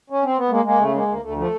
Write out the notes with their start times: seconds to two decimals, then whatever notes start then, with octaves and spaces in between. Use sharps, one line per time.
0.10 C#4
0.24 C4
0.37 B3
0.50 G#3 A#3
0.64 G#3 A#3
0.79 C#3 A3
0.94 G#3 A#3
1.08 D2 A#3
1.22 D2 A3
1.36 F3 A3